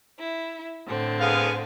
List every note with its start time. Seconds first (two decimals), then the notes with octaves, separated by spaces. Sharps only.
0.19 E4
0.86 A2 D3 C4
1.20 B3 G#4 F5